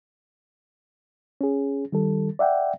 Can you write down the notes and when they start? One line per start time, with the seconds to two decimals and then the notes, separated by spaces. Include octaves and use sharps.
1.41 C#4 G#4
1.92 D#3 G3 A4
2.39 D5 E5 F#5 G5